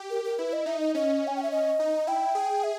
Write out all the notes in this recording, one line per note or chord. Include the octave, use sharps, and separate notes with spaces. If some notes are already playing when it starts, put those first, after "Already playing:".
Already playing: G4
A#4
A#4
E4 B4
D#5
D#4 E5
D#5
C#4 D#5
G#5
G5
E5
D#5
D#4
E4 G5
G#4
E5